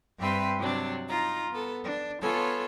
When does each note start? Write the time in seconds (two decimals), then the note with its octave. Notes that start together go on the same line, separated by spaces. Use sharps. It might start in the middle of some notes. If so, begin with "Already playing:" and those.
0.18 G2 C4 G4 B4 E5 C6
0.58 C3 F#3 D4
1.09 D#4 F4 A#5
1.51 B3 A4
1.83 D4
2.21 B3 F4 A4 C#5 G#5